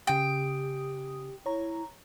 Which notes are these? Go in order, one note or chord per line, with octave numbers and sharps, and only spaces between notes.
C#3 G4 G5 D#6
E4 C#5 A#5